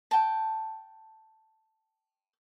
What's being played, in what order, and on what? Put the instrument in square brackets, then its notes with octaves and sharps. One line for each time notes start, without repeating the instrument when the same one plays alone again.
[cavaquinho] G5 A5